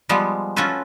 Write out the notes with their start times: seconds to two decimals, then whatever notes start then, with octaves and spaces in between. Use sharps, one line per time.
0.09 F3 G3 G#3 B3
0.56 C#4 F4 F#4 A4 B4 C5